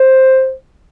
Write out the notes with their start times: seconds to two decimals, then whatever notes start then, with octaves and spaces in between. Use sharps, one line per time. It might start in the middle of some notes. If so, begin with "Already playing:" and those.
Already playing: C5